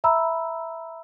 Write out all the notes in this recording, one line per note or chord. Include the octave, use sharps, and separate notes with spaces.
E5 A#5 B5 E6